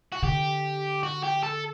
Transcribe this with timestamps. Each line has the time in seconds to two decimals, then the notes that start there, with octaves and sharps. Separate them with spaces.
0.12 F#4
0.23 D3 G4
1.03 F#4
1.23 G4
1.43 A4